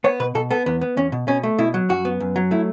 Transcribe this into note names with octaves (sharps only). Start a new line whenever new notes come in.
B3 C#5
B2 B4
B2 A4
B3 A4
E2 B3
B3
E2 C#4
B2
B2 C#4
A3
B2 E4
F#3
F#2 F#4
B3
F#2
F#3
A3 E4